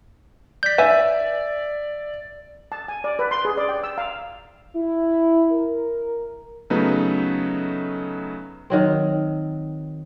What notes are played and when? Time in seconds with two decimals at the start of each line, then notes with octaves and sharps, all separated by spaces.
0.63 D5 G6 B6
0.78 B4 E5 G#5
2.72 A5
2.88 G#5
3.04 D5
3.19 B4
3.31 C6
3.45 G#4
3.57 D5
3.69 G5
3.84 E6
3.98 F5
4.75 E4
5.51 A#4
6.70 C#3 F#3 A3 B3 D#4 B4
8.70 D#3 F#3 C4